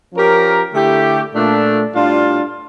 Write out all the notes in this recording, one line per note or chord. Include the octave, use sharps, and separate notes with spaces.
F3 C#4 G4 A#4
D3 A3 E4 G4
A#2 A3 D4
A2 G3 D4 F4